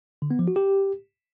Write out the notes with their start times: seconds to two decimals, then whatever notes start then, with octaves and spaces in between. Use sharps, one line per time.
0.22 D3
0.31 B3
0.39 F3
0.48 F#4
0.56 G4